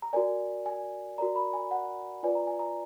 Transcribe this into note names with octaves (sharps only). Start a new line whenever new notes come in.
A#5
F#4 A#4 D5 G#5
G#5
F#4 A#4 D5 A#5
B5
G#5
F#5
F4 B4 D5 G#5
A#5
G#5
A#5